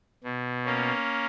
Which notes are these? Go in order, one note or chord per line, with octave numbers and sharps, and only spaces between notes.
B2
A#3 C#4